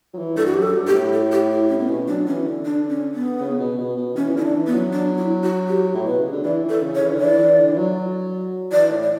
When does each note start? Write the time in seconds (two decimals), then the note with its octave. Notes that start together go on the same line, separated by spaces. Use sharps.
0.14 F#3
0.17 E3
0.37 G2 A4
0.46 F#4
0.54 F#2 G4
0.62 A4
0.75 G2
0.87 B2 G4
0.94 A2
1.13 A4
1.32 G4
1.51 E4
1.69 C#4
1.79 A2 B3
1.88 B2 C#4
2.08 F#3 D4
2.27 E3 C#4
2.45 D3
2.65 D4
2.90 C#4
3.15 B3
3.40 C#3
3.59 B2
3.78 B2
3.97 B2
4.16 E3 C#4
4.29 E3
4.35 D3 E4
4.42 D4
4.55 E3
4.67 B3
4.73 F#3
4.93 D4
5.17 E4
5.43 F#4
5.68 G4
5.94 A2
6.06 B2 B4
6.19 C#3
6.32 D3
6.44 E3 D5
6.63 E3
6.69 A4
6.82 C#3
6.95 C#5
7.01 E3
7.11 D3
7.20 E3 D5
7.38 E3
7.58 D3
7.72 E3
7.77 F#3
8.71 E3 D5
8.91 A2
9.03 D5